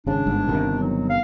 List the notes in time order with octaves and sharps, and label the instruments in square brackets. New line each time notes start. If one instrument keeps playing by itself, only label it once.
[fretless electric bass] G#1 C#3 [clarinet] D4
[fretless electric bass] G1 G#2
G1 C3 D#3
[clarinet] F#3
F5